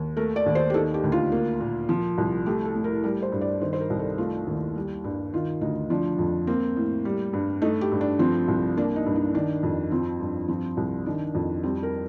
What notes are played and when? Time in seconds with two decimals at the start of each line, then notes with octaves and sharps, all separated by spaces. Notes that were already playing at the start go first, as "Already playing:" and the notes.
Already playing: D#2
0.17 A3 A#4
0.36 D5
0.46 D#2
0.55 C5
0.70 G4
0.74 D#3 A4
0.94 G4
1.04 D2
1.12 F4
1.32 A#3
1.61 A#2
1.89 F3
2.18 C2
2.46 A3 G4
2.65 A4
2.75 A2
2.84 A#4
3.04 G3 A#4
3.22 C5
3.32 G2
3.41 D5
3.61 D#3 C5
3.73 C5
3.80 A#4
3.90 C2
3.99 A4
4.18 A3 F4
4.47 D#2
4.75 G3
5.04 G2
5.34 D#3 F4
5.61 D2 D#4
5.90 F3 D4
6.18 F2
6.47 A#3 C4
6.76 A2
7.05 G3
7.33 G2
7.62 A3 D#4
7.81 G4
7.92 G2
8.01 D4
8.19 F3 C4
8.48 C2
8.77 A#3 D4
8.96 D#4
9.06 G2
9.16 D#4
9.34 D#3 D4
9.63 F2
9.91 F3 C4
10.20 G2
10.48 F3 C4
10.77 C2
11.06 D#3 D4
11.35 F2
11.63 G3 C4
11.83 A#4